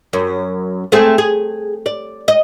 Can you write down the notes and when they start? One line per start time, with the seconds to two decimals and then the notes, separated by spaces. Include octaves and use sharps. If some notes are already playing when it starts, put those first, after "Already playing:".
0.13 F#2
0.92 A3 C4 G#4
1.18 G#4
1.86 D5
2.28 D#5